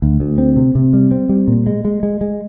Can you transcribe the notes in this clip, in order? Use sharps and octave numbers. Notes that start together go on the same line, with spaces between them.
D2
D2
C4
C3
C3
G3
C4
G3
A#2
G#3
G#3
G#3
G#3